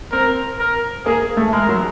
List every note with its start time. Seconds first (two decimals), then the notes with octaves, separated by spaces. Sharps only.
0.12 C4 A#4
0.60 A#4
1.06 A#3 G#4
1.37 A3
1.52 G#3 A#4
1.69 F#3